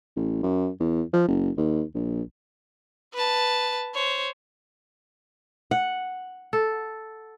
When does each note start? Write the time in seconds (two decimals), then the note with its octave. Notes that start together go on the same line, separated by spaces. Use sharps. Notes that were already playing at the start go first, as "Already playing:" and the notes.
0.16 A1
0.43 F#2
0.80 E2
1.13 F3
1.28 F#1
1.57 D#2
1.94 A#1
3.13 B4 A5
3.94 C5 C#5
5.71 F#5
6.53 A4